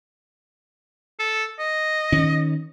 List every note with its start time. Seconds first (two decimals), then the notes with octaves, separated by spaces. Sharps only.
1.19 A4
1.59 D#5
2.12 D#3 C#4